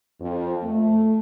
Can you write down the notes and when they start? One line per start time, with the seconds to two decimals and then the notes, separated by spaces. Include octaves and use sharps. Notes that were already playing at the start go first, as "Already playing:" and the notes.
0.20 F2
0.63 A3